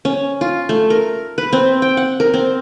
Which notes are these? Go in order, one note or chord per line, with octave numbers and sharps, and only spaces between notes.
C#4
F4
A3
A#4
B4
C4
G5
F#5
A#4
C4